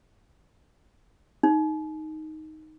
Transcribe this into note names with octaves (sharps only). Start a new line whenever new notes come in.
D#4